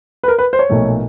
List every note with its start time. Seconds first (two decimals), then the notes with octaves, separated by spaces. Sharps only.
0.23 B4
0.28 A#4
0.39 B4
0.53 C5
0.59 C#5
0.69 B1 A#2 F3 A3